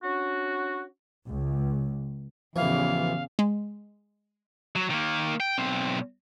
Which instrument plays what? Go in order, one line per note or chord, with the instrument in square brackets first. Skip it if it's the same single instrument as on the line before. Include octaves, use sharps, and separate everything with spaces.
[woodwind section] C#4 D4 F#4
[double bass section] C#2
[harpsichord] A1 E3 [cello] E2 C#3 [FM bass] F3 [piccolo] F5
[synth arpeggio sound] G#3
[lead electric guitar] F#3
D#3 A#3
G5
B1 C4